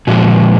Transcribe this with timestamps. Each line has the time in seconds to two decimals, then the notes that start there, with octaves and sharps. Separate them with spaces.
0.07 A#2 F3 G#3 F#4